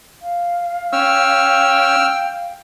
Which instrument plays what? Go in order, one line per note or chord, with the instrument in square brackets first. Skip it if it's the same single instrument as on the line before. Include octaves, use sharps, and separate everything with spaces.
[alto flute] F5
[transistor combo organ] C#4 [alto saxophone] G5 [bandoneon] E6 F6